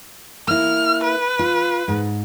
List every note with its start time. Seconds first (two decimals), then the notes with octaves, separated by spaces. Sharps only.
0.48 A#3 E4 F6
1.03 B4
1.39 F4
1.88 G#2